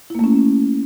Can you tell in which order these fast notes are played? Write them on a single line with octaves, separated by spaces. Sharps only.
E4 A#3 A3 C#4